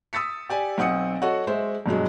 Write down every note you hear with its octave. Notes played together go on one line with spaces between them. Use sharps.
D#6 E6 A6 B6 C#7
G4 D5 G#5
B1 C4 F#5 D#6 C#7
F#4 A4 C#5 D#5 F#5
G#3 C5 E5
G2 B2 F#3 G#3